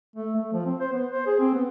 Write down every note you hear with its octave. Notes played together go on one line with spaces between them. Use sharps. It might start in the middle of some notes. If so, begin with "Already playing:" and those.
A3
A3
F3
C4
C5
B3
C5
G#4
C4
B3